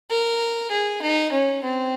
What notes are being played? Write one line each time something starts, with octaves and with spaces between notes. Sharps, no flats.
A#4
G#4
D#4
C#4
C4